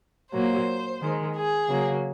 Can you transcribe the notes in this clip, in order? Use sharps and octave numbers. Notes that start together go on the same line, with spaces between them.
A#2 F#3 A#3 C5
D#3 G#3
G#4
C#3 F#3 A#3